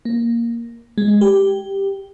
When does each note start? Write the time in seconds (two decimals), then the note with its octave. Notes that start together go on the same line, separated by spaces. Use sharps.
0.05 A#3
0.98 G#3
1.21 G4